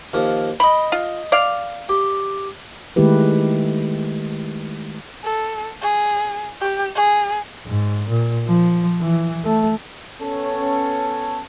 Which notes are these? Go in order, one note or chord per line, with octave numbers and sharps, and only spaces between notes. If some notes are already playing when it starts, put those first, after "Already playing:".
D#2 F3
D#5 G5 B5
F4
D5 F5
G4
D#3 G#3 A3 E4 G4 B4
A4
G#4
G4
G#4
G#2
A#2
F3
E3
A3
B3 C#4 A4 C#5